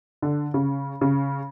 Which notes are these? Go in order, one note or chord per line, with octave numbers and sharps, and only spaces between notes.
D3
C#3
C#3